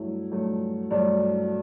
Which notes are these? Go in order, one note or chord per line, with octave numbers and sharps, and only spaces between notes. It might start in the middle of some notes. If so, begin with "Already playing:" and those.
Already playing: G2 F#3 A3 E4
G2 F#3 A3
G2 F#3 A3 D4